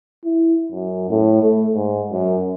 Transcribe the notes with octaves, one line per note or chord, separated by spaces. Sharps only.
E4
F#2
A2
A3
G#2
F#2